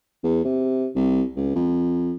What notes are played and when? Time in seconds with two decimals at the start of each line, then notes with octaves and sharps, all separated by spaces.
0.24 E2
0.45 C3
0.95 C2
1.36 C#2
1.55 F2